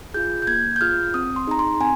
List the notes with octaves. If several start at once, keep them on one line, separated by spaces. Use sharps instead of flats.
F4 G#4 G6
G6
A#3 G#6
G6
F4 G#4 F6
C4 D#6
C6
D#4 G#4 A#5
C6
C4 G#5